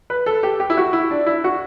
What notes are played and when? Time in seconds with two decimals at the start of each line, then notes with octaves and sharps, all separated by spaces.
0.10 B4
0.26 A4
0.43 G4
0.60 G4
0.70 E4
0.77 F#4
0.93 E4
1.11 D4
1.26 E4
1.44 F#4